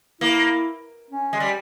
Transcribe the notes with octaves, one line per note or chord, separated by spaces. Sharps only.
A#3 E4
C#4
G#3
G3